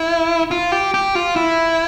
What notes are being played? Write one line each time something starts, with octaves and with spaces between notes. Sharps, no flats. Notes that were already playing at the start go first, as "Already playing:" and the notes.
Already playing: E4
F4
G4
G4
F4
E4